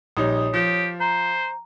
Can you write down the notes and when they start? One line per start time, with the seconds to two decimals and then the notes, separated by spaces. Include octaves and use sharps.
0.17 A#1 G3 D#4 C#5 D#6
0.54 F3 G4
1.00 C5 A#5